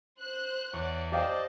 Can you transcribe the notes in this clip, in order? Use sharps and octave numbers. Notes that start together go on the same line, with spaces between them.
C5 F#6
E2 C#5 D5 F#5 C#6 F#6
G4 C5 D5 D#5 F5 G5 A5